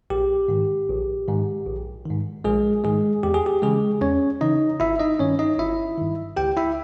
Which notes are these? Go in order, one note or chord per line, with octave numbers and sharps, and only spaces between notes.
A#1 G4
G#2 D#3
A#1
G#2 D#3
A#1
G#2 D#3
A#1 G#3 G#4
G#2 D#3 G#3 G#4
E2 G4
G#4
G4
C#3 E3 G#3 G#4
E2 C#4 C#5
C#3 E3 D#4 D#5
G1 E4 E5
D#4 D#5
G2 D#3 C#4 C#5
D#4 D#5
G1 E4 E5
G2 D#3
C#2 G4 G5
E4 E5